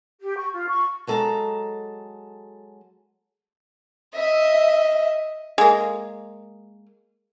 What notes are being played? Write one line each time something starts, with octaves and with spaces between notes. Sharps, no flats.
G4
C#6
F4
C#6
F#3 G#3 A4 F#5 A#5
D#5 E5
G#3 A#3